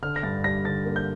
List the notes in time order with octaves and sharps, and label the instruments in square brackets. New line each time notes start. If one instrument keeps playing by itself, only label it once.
[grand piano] D3 F6
A#6
G2 A6
G3 A#6
D3 A6
A#3
G6